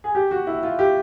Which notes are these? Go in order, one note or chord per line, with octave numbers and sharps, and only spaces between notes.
G#4
G4
F#4
E4
F4
G4